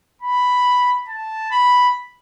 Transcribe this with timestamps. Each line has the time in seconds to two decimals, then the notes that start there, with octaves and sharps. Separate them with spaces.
0.22 B5
1.08 A5
1.50 B5